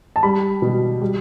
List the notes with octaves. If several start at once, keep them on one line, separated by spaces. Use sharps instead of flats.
A5
G3 B5
B2
G3